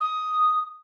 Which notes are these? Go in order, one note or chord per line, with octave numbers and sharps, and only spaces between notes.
D#6